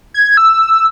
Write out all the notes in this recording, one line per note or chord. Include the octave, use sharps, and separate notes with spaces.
G#6
E6